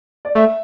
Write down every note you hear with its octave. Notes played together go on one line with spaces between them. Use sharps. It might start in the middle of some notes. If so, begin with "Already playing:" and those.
D5
A3 E5